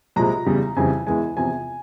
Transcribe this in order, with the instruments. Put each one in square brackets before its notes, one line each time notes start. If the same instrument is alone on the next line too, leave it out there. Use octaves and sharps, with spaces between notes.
[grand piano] C2 A#2 F3 G#3 A#5
E2 C#3 G3
F2 C#3 E3 G3 G#5
E2 E3 G#3 G#5
E2 C3 F3 G#5